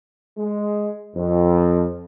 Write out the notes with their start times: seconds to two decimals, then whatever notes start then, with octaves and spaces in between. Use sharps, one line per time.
0.37 G#3
1.15 F2